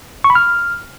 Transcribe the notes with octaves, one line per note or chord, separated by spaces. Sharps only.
C#6
B5
F6